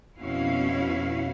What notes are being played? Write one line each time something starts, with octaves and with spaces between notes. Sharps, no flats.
F2 B2 C#4 E4 F#4 F5